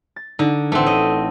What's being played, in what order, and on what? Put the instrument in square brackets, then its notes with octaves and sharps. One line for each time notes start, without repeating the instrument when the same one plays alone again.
[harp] A6
[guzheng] D3 [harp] D#4
[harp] A1 F#5 [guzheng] A3 C4
[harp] C#5 [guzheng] D#5